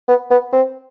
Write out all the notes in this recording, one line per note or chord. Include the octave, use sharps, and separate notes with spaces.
B3
B3
C4